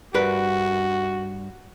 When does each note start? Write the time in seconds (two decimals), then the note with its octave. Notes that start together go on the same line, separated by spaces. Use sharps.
0.14 G2 F#4 A#4 B4